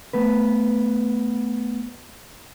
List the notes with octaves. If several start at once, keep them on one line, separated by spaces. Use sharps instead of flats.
A3 B3 B4